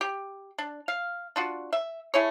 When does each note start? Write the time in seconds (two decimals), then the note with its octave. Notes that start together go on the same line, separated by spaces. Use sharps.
0.01 G4
0.58 D4
0.88 F5
1.36 D4 F4 F#4
1.73 E5
2.14 A3 E4 G#4 C#5